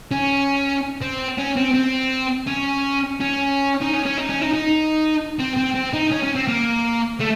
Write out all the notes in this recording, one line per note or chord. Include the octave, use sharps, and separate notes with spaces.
C#4
C4
C#4
C4
C4
C#4
C#4
D#4
C#4
C#4
D#4
C#4
D#4
D#4
C4
C4
C4
D#4
C#4
C#4
C4
A#3
A3